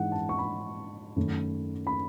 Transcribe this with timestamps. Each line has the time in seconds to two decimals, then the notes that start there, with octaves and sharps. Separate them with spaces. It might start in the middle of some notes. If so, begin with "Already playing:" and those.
Already playing: G#2 E3 G#3 D#4 F#5
0.12 A5
0.29 C#6
0.38 B5
1.16 F#2 D#3 A3
1.87 B5